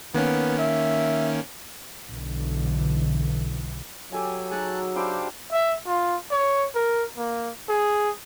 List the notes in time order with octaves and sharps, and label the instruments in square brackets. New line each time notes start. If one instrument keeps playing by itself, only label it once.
[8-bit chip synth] D#3 A#3 C#4 [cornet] B3
[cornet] E5
[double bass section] B1 D3 E3
[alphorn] F#3 [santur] G4 A4 G#5
[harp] D#4 F#4 G#4 [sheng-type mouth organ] A5 F#6
[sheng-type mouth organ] D4 C5 F5 [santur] E4 G4 G5
[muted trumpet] E5
F4
C#5
A#4
A#3
G#4